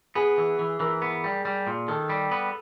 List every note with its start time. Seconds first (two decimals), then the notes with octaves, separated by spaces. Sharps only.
0.16 B3 G#4
0.38 E3
0.59 E3
0.80 E3 A#4
1.02 B3
1.24 G3
1.45 G3
1.67 A#2
1.88 D#3 A4
2.10 G3
2.31 B3